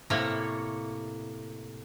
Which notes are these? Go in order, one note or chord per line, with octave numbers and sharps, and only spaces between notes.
A2 C3 A#3 C#5